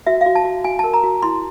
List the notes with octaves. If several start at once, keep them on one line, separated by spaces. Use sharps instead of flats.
F#4 E5
F#4 F5
A5
F#4
F#4 G#5
A#4 A5
A#5
F#4
E4 C6